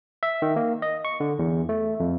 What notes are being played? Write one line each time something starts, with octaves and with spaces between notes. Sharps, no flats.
E5
D#3
A#3
D#5
C#6
D3
E2
A3
F2